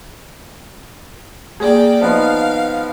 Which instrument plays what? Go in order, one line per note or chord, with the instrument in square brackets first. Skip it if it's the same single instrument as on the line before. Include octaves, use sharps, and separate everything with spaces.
[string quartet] A#3 D5 G5 [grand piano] G#4
[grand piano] F3 B3 D#4 [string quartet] F5